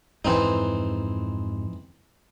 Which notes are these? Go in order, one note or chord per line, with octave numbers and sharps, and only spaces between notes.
F2 G#2 E3 C4 D#4